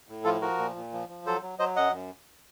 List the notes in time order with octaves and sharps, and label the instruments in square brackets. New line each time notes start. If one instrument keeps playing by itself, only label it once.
[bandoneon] A2
F3 F4 A4
F3 F#4 A#4
A#2
A#2
F3
F3
F#3 A4 C5
F#3
F#3 C5 D#5
F#2 D#5 F#5
F#2